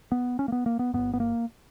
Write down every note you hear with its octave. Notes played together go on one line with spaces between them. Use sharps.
B3
C#4
A#3
B3
A#3
B3
G1 G2 B3
B3
A#3